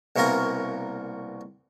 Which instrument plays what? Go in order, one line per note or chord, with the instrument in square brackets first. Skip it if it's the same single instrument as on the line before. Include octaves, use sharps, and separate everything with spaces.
[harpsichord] C2 B2 A#3 A#4 G#5